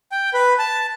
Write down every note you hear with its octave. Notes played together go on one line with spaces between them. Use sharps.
G5
B4
A5